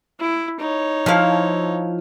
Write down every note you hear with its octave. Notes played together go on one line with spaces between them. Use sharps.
E4
D#4 C#5
F3 E4 F5